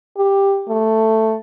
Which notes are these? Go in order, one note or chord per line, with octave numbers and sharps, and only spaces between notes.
G4
A3